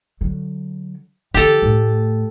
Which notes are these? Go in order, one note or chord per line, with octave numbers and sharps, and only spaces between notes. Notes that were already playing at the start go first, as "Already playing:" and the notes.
D3 F#3
D3 E3 G4 A4
A2 A3